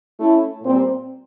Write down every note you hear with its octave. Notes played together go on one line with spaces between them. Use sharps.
A3 C#4 E4
A#2 G3 C4